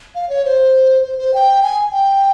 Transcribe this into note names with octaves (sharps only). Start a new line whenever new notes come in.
F5
C#5
C5
C5
C5
G5
G#5
G5